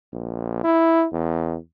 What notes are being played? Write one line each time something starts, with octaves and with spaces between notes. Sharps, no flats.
A#1
E4
E2